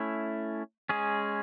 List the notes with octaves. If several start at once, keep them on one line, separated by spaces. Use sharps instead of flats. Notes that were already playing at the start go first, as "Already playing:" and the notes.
Already playing: A3 C#4 E4
G#3 C#4 G#4